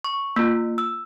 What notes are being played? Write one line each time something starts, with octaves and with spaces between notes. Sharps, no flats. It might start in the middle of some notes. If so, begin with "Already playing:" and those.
C#6
A#3 F4
E6